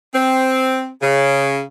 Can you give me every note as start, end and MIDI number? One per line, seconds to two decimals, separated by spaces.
0.14 0.89 60
1.01 1.61 49